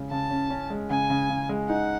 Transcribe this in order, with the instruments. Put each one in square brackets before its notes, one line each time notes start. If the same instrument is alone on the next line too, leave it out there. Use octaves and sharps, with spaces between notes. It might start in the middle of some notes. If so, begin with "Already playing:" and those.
Already playing: [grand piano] C#3 G#3 C#4
[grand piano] C#3 [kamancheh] A5
[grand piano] C#4
C#4
G#3
[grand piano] C#3 [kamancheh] G#5
[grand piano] C#3
C#3
G#3
[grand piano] D#4 [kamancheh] F#5